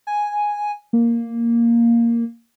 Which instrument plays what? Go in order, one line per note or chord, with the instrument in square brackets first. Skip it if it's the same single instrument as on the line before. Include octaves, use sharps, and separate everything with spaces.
[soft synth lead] G#5
A#3